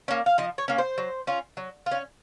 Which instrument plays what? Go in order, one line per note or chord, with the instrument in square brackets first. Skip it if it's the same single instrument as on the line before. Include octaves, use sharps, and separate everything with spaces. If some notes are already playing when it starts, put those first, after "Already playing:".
[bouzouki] A#3 C#4
F5
F3 D#5
C#5
A#3 C#4
C5
F#3
C#4 F4
F#3
F4
C#4